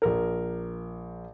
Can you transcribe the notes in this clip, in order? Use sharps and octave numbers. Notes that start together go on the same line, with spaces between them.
A#1 A#4